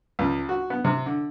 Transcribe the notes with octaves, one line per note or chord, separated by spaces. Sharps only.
C#2
F#4
B3
C3
D3